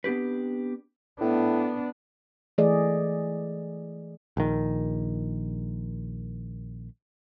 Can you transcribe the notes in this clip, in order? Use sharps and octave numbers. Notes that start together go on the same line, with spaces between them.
B3 C4 D4 G4 B4
A2 B3 D4
E3 A3 G#4 D5 D#5
A#1 D#3